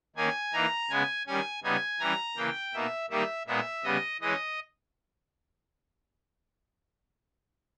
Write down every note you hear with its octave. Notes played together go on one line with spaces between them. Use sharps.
D#3 A#3 C#4 G#5
E3 A#3 D#4 A#5
C#3 G#3 B3 G#5
D#3 G3 C#4 G#5
C#3 G3 B3 D#4 G#5
E3 G3 C#4 A#5
C#3 E3 A#3 G5
B2 A#3 D#4 E5
D#3 G3 A#3 D#4 E5
A#2 G#3 B3 D#4 E5
C#3 G3 B3 D#5
E3 G#3 C#4 D#5